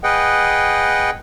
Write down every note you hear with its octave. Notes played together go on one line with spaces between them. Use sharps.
G#4 B4 D#5 F#5 G5